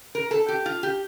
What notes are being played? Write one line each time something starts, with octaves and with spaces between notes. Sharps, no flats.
A#4
A4
G4
F4
G4